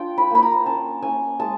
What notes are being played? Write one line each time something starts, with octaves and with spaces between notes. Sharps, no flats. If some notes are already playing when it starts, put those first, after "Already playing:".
Already playing: D4 F4 G5
B5
A#3 B5
A#5
C#4 A5
C#4 G#5
G#3 A5